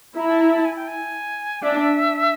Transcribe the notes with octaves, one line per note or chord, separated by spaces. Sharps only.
E4 A#5
A5
A#5
A5
G#5
G5
G#5
D4 E5